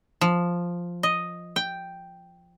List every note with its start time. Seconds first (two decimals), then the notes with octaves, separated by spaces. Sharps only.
0.21 F3
1.03 D#5
1.56 G5